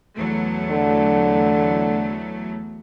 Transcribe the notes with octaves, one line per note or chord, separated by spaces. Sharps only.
E2 F#3 A3
D3